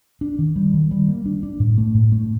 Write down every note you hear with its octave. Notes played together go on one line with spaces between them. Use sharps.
D4
D#3
G3
D#3
G3
A#3
D4
D4
A2
A3
A2
A3